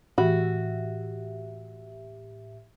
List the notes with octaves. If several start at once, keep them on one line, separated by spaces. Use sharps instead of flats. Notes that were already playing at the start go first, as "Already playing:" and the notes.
A2 E3 F#4 G4 E5 B5